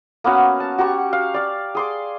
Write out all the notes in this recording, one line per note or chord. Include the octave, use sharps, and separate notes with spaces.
A#3 B3 C#4 F#4
A5
F#4 G4 A#5 C#6
F5
D5 F5
G#4 C6 D6